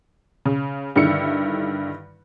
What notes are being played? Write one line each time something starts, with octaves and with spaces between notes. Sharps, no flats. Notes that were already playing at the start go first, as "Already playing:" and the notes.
C#3
G2 D3 D#3 E4 C#7